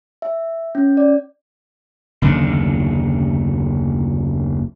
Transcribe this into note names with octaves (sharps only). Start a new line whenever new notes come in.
E5
C#4
D5
F#1 D#2 D3